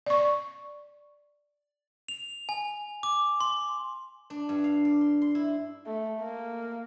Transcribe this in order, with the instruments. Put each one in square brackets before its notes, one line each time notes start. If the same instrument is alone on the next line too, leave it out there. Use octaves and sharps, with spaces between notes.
[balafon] D5 C#6
[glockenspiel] F7
G#5
D6
C6
[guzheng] D4
G2
F5
D5
C6
C6
E4
[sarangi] A3
A#3